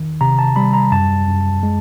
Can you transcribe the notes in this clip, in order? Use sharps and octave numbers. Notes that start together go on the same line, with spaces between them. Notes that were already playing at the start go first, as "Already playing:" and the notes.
Already playing: D#3
C3 A#5
A5
G3 B5
A#5
F#2 A5
F#2
G#3